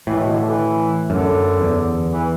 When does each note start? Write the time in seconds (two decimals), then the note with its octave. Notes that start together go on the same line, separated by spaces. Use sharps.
0.07 A2 E3
0.19 B2
0.32 D3
0.45 E3
1.09 F#2 D3
1.61 E2
2.12 E3